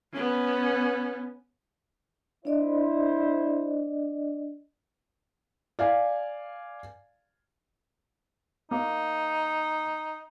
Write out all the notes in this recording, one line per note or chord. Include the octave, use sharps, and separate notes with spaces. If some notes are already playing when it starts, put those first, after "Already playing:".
B3 C#4
D4 E4 C5 D5 D#5
D5 F5 G#5
A#3 D#4